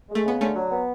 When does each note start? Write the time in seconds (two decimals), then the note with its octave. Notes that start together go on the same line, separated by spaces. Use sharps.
0.09 G#3
0.15 A3
0.26 C#3 B3
0.41 D3 A3 C#4
0.56 F#3
0.71 B3